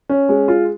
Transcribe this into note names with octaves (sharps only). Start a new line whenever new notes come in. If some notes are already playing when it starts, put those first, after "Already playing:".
C#4
G#3
F4